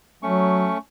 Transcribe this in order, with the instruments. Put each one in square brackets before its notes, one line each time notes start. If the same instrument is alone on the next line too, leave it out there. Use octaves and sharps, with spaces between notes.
[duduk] F#3 [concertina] A3 C#4 C#6